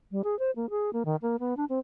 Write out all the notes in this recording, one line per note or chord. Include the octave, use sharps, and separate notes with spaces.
G3
G#4
C5
A#3
G#4
A#3
D#3
A#3
B3
D4
C4